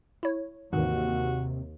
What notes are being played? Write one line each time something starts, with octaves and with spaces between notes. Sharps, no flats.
E4 C#5
D#2 G#2 C3 D#3 E3 F#4